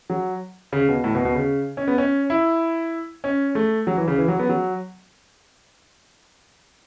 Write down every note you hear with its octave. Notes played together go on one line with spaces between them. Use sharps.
F#3
C#3
B2
A2
B2
B2
C#3
C#4
B3
C#4
E4
C#4
A3
F#3
E3
C#3
E3
F#3
B3
F#3